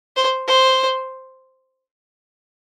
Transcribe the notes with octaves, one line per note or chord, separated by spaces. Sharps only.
C5
C5